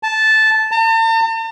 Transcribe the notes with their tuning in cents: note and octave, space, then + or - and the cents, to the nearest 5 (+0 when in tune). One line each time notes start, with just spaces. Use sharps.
A5 -10
A5 +45